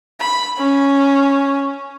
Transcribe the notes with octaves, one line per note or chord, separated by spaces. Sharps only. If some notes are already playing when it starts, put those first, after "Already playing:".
B5
C#4